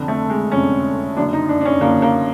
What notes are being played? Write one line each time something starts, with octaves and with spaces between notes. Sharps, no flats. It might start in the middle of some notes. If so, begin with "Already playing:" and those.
Already playing: F1 F2 D3
A3
G#3
F1 F2 D3 C#4
F#1 F#2 D3 D4
D#4
D4
D4
C#4
F#1 F#2 D3 A#3
A#3